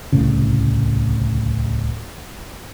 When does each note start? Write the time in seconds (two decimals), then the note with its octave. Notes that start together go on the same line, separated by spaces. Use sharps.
0.13 D1 C2 A2 C#3